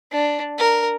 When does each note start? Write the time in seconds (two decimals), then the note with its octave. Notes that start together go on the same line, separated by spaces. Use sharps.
0.12 D4
0.59 A#4